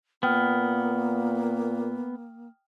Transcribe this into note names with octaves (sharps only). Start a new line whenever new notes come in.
A#2 A#3 B3 G5 D#6 F6